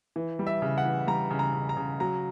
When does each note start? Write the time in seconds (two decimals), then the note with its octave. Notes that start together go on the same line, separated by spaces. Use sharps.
0.16 E3
0.39 G3
0.47 E5
0.62 C#3
0.78 F#5
0.85 E3
1.07 G3 A#5
1.31 C#3
1.39 A#5
1.54 C#3
1.69 A#5
1.77 C#3
2.00 F#3 A#5